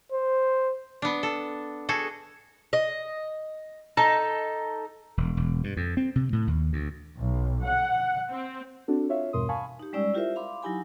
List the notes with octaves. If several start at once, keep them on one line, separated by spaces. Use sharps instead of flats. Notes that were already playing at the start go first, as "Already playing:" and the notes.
C5
B3 D4
A4
F#4 G#4 A4
D#5
D#4 A4
E1
E1
G2
F2
C4
C3
A2
D#2
D2
B1
F#5
C4
C4 D4 F#4 A4
F4 C#5 E5 F5
E2 G2 B2 A#4 C6 D#6
F5 G#5 A5 B5 C#6
D#4 G4
G3 G#3 C#4 D5 G5 E6
E4 F4 G4 A#4 C5 E5
F5 B5 C6 D6
F#3 D#4 E4 G4 G#5 B5